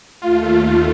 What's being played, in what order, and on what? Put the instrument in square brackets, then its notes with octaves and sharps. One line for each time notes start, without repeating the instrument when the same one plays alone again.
[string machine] D#2 A3 [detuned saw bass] F4